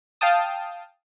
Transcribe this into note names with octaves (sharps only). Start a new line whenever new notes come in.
F5 G5 A5 D#6